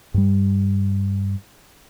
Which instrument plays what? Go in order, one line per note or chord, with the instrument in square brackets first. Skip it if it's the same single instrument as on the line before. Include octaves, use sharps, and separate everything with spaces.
[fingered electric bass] G2 G3